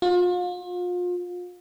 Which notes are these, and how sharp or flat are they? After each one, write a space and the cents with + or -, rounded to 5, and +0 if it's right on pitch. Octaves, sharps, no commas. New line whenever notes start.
F4 +35